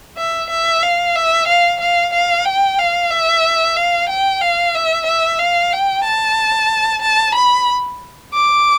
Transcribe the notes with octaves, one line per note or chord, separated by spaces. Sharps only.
E5
E5
F5
E5
F5
F5
F5
G5
F5
E5
F5
G5
F5
E5
E5
F5
G5
A5
A5
B5
D6